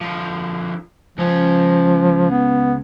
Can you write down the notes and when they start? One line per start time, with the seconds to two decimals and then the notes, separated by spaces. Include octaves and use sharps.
0.01 D3 F3
1.18 C#2 F3 C#4
2.30 B3